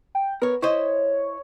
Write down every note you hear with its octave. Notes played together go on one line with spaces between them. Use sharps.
G5
B3 A#4 C#5
E4 C5 C#5 D#5